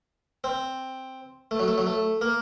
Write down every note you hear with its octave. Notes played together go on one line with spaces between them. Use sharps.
C4
A3
F#3
A3
F#3
A3
A#3